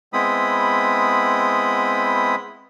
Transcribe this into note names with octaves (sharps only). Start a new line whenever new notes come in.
G#3 B3 C4 E4 B5 D#6